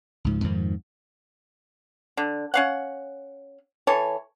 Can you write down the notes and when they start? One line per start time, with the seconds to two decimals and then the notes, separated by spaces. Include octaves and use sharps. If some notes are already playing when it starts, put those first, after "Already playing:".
0.24 C#2 G#2 F3
0.44 F2 G#2 D#3 F3
2.17 D3
2.54 C#4 F5 F#5
3.87 E3 A4 C#5